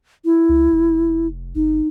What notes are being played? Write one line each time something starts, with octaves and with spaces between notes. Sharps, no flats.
E4
C#2
F1
G1 D#4